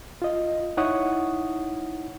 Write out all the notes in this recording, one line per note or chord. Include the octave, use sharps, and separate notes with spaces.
F4 D#5
D#4 E4 C#5 F#5 C#6 D#6